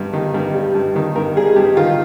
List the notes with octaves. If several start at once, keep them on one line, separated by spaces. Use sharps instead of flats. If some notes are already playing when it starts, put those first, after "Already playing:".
Already playing: G2 G3
D#3
G2
G3
G2
D#3
G2 A#4
G3 G#4
G2 G4
D#3 F4